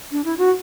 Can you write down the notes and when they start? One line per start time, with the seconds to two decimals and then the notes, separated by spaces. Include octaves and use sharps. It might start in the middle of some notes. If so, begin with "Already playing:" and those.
0.12 D4
0.25 E4
0.38 F#4